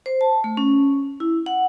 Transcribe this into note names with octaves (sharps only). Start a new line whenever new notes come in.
C5
A5
A3
C#4
E4
F#5